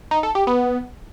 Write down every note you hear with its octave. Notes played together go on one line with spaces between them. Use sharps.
D#4
A4
G4
B3